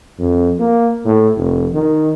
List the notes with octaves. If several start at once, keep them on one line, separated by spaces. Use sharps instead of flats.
F2
A#3
A2
F1
D#3